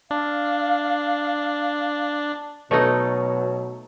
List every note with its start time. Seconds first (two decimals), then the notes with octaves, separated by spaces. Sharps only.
0.11 D4 F5
2.71 B2 F#3 A3 D#4 A4 B4 C#5 D#5